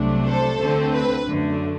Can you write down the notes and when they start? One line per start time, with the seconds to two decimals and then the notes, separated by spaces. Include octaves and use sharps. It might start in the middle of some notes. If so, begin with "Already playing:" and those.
Already playing: C2 C3 F#3 A3 D4
0.25 A4 C5
0.58 D2 D3 A3 C4
0.92 B4
1.26 F#2 D3 A3